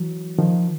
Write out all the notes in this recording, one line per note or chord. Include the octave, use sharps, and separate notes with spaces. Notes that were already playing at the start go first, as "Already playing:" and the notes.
Already playing: E3 F#3
D#3 F3